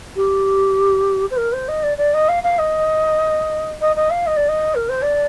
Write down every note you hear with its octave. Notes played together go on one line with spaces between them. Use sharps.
G4
C5
A#4
C5
D#5
D5
D5
D#5
F5
F5
D#5
D#5
D#5
F5
D#5
D5
D#5
A#4
C5
D5